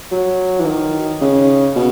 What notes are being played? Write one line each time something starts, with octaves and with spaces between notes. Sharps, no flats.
F#3
E3
D#3
C#3
B2